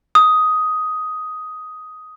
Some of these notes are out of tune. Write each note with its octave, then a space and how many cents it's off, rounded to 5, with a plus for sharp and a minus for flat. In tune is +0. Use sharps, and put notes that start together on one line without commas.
D#6 +10